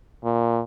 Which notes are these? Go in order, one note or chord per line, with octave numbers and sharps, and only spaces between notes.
A#2